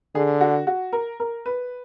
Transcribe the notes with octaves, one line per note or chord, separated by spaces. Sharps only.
D3 G#4
F#4
F#4
A#4
A#4
B4